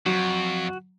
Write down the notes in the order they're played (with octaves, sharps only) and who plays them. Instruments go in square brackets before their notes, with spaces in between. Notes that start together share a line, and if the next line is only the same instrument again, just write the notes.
[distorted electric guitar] F2 [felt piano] F#3 [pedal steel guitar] F#4